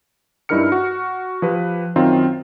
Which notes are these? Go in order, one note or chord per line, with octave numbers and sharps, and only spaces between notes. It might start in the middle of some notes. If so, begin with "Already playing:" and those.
G2 D#4 E4 A#4 F6 C#7
F#4
F3 G4 B4
F#2 D#3 C4 D#4 F4